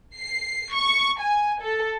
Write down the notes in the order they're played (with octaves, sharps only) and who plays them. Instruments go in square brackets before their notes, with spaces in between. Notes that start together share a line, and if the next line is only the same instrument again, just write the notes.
[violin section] C7
C#6
G#5
A4